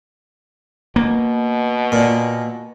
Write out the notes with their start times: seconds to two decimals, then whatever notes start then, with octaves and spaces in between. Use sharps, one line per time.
0.96 B2 A#3
1.92 A#2